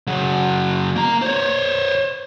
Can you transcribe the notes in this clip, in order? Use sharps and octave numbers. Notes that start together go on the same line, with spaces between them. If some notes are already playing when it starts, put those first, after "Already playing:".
C#3 F#3
A#3 A#5
C5 C#5